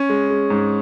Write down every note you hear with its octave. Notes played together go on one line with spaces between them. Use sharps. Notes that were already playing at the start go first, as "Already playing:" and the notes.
Already playing: C#4
G#3
G#3
G#2